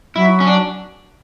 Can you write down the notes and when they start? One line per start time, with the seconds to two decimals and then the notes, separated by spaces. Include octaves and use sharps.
0.16 F#3 E4
0.40 C#4
0.47 D4